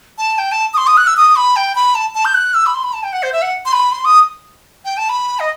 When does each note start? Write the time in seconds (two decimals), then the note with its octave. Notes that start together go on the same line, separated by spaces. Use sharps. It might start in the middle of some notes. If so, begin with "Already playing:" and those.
0.18 A5
0.38 G5
0.52 A5
0.74 D#6
0.78 C6
0.87 D#6
0.97 F#6
1.07 E6
1.17 D#6
1.36 B5
1.56 G5
1.75 B5
1.95 A5
2.15 A5
2.25 G6
2.34 F#6
2.54 E6
2.66 B5
2.74 C6
2.84 B5
2.93 A5
3.03 G5
3.13 F#5
3.23 C5
3.33 E5
3.42 F#5
3.66 C6
3.73 B5
3.92 C6
4.05 D#6
4.85 G5
4.97 A5
5.09 B5
5.40 D#5